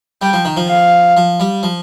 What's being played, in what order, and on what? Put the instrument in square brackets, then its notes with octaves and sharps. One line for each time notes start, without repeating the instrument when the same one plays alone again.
[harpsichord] G3 [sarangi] G5
[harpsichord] F3
D#3
F3
[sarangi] F5
[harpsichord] F3
G3
F3